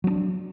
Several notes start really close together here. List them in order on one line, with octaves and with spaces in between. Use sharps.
F#3 C4 D4